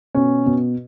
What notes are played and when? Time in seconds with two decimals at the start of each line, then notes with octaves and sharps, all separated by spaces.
0.15 B2 C#4
0.46 B2